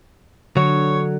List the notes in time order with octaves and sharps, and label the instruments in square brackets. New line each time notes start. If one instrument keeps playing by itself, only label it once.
[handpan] D3 [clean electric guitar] F#3 [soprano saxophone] C#5